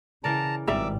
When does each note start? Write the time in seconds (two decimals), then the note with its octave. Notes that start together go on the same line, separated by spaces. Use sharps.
0.24 C#3 E3 A#4 D5 A5 A#5
0.67 G#1 G3 D5 E5 A#5 D6 E6